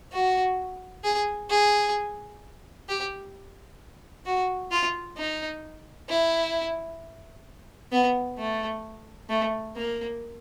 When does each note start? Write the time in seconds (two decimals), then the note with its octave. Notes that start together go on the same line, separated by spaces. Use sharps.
0.12 F#4
1.04 G#4
1.50 G#4
2.88 G4
4.26 F#4
4.71 F4
5.17 D#4
6.09 E4
7.92 B3
8.38 A3
9.29 A3
9.75 A#3